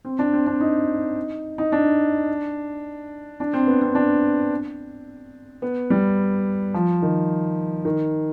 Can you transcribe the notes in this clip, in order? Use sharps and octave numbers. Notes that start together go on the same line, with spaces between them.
C4
D4
C4
D4
D#4
D#4
D4
D4
C4
B3
C4
D4
B3
G3
F3
D#3
D#3